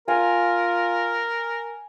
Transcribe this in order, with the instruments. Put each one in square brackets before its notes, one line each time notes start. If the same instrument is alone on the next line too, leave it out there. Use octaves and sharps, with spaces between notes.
[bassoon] F4 [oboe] A#4 [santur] G#5